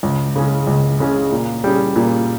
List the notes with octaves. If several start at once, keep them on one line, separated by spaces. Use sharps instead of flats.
C#2
C#3 G#3 C#4
C#2
C#3 G#3 C#4
A#2
G3 C#4 G#4
A#2